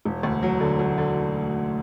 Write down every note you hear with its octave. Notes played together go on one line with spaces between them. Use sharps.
E1
D2
F#3
D3
F#3
D3